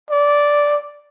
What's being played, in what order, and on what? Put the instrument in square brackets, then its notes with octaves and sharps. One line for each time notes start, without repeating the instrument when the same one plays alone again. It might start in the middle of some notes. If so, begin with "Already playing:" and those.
[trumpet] D5